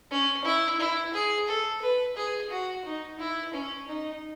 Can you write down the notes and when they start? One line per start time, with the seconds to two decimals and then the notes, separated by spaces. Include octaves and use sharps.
0.11 C#4
0.45 E4
0.80 E4
1.14 G#4
1.48 A4
1.82 B4
2.17 G#4
2.51 F#4
2.85 D#4
3.19 E4
3.53 C#4
3.88 D#4